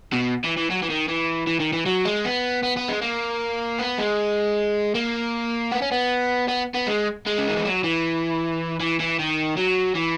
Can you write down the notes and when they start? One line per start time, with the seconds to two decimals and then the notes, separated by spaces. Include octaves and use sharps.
0.13 B2
0.44 E3
0.57 E3
0.71 F#3
0.83 E3
0.90 D#3
1.09 E3
1.47 E3
1.60 D#3
1.73 E3
1.86 F#3
2.05 G#3
2.25 B3
2.63 B3
2.77 B3
2.88 G#3
3.02 A#3
3.79 B3
3.98 G#3
4.95 A#3
5.72 B3
5.82 C#4
5.92 B3
6.49 B3
6.75 B3
6.87 G#3
7.27 G#3
7.38 C#3
7.48 D#3
7.57 E3
7.65 F#3
7.84 E3
8.80 E3
9.00 E3
9.19 D#3
9.58 F#3
9.96 E3